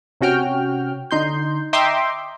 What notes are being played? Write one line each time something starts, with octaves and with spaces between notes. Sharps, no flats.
C3 C#4 F#4 G5 F6
D3 D#4 C6 G6
D#5 E5 G5 A#5 C6 D6